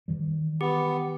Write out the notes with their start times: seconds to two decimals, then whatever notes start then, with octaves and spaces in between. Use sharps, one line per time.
0.08 D#3 E3 G3
0.61 B3 G4